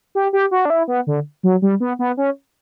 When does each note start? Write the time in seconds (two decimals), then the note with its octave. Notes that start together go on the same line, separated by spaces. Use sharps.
0.15 G4
0.33 G4
0.51 F#4
0.65 D4
0.70 E4
0.88 B3
1.07 D3
1.43 F#3
1.62 G3
1.80 B3
1.99 B3
2.17 C#4